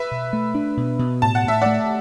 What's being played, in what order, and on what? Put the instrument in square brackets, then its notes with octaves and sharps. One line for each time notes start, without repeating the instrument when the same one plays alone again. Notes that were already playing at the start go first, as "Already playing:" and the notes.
Already playing: [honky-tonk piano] B4 E5
[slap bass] B2
A3
D4
B2
B2
[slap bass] A2 [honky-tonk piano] A5
[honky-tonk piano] F#5
[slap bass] A2 [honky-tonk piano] E5
[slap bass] A3 [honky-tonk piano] D5 F#5